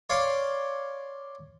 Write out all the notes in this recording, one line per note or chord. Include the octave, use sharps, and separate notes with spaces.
C#5 D5 F5 C6